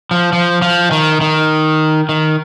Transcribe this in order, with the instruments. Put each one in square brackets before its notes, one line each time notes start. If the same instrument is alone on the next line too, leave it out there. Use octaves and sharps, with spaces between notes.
[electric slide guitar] F3
F3
F3
D#3
D#3
D#3